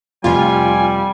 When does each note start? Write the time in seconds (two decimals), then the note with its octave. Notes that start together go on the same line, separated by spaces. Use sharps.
0.24 F1 F2 G3 F4 G#5